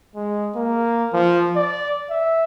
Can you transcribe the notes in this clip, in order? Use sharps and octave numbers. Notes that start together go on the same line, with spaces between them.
G#3
A#3
F3
D5
E5